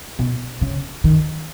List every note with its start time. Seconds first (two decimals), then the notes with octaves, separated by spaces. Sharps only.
0.19 B2
0.62 C#3
1.04 D#3